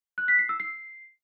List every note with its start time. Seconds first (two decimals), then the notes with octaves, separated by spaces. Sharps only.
0.18 F#6
0.28 B6
0.39 C7
0.49 E6
0.60 C7